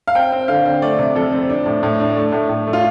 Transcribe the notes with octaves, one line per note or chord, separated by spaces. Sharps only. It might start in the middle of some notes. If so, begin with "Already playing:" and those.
F5
C4 G5
C4
D3 F5
C4
A3 D5
C3
F2 A4
C4
D4
A2
A2
D4
A3
A2
A2
A3
F4